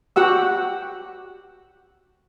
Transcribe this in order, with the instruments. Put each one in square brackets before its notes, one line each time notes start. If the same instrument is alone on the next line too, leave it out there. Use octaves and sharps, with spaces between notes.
[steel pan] F#4 G4 F#5 E6